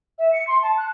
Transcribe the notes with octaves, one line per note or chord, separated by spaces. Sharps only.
E5
C#7
C6
A5
F#6